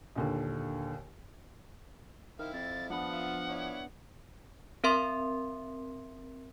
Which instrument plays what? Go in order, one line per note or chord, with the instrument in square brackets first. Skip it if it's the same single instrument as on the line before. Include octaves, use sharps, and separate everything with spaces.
[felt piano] A#1 D#2 D3
[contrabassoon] D#3 [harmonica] C4 E4 F5 [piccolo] F6
[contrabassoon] F2 [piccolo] A6
[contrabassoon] F3 [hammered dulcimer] B3 D4 [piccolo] F#5
[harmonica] F4 E5
E4 C#5 D5
[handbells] C4 A#4 E5 C6